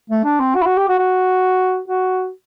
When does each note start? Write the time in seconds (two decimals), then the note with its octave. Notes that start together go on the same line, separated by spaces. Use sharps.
0.10 A3
0.24 D4
0.40 C4
0.55 F#4
0.62 E4
0.66 F#4
0.77 G4
0.88 F#4
0.99 F#4
1.88 F#4